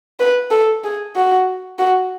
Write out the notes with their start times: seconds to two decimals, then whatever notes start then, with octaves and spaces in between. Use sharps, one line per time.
0.20 B4
0.51 A4
0.84 G#4
1.16 F#4
1.79 F#4